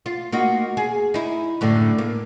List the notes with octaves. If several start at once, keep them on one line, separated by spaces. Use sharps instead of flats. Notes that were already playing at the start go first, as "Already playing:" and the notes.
F4
A#3 D#4 F#4
G#4
D#4 E4
F#2 A2 D3
A#3